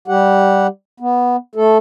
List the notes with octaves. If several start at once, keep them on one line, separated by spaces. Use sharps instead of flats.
G3 G4 F#5
B3
A3 A4